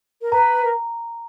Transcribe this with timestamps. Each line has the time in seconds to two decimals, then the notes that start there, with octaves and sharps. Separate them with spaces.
0.22 A#4
0.32 B4 A#5
0.65 A#4